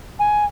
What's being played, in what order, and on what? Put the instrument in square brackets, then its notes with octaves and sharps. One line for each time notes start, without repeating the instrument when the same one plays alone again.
[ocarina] G#5